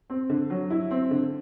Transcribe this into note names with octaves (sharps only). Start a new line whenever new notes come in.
C4
D3
F#3
E4
C4
D3